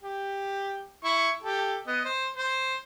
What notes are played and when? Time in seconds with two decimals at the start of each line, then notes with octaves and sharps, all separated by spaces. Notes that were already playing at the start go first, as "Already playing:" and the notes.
0.02 G4
1.04 E4 C#6
1.42 G4 A4
1.87 B3 D#5
2.05 C5
2.36 C5